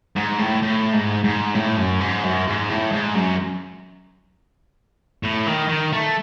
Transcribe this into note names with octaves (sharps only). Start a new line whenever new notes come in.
G#2
A2
A2
G#2
G#2
A2
F#2
G#2
F#2
G#2
A2
G#2
F#2
A2
D#3
D#3
A3